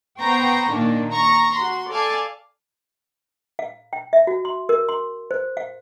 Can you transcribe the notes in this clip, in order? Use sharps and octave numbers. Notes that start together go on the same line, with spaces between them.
B3 C5 G5 A#5 C#6
A#2 D#3 A#3 D4
A#5 C#6
F#4 C6
A4 D5 F5 G#5 A5
F5
G5
E5
F#4
C6
A#4
C6
C5
F5